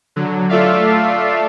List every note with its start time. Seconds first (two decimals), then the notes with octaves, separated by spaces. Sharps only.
0.16 D3 F#3
0.49 A3 F4 A4 D5 E5 F5